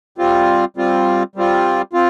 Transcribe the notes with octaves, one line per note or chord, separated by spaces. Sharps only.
G3 C4 F4
G3 C4 F4
G3 C4 F4
C4 F4